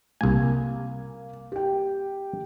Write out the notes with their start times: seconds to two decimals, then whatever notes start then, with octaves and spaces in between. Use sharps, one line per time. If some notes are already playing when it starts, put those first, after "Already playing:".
0.21 C2 A#3 G#5
1.52 G4 G5